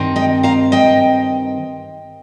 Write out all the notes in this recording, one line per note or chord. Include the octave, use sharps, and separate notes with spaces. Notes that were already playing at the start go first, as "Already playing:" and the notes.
Already playing: G2 D#3 C4 D#4
D#5 G5
F5 A#5
D#5 G5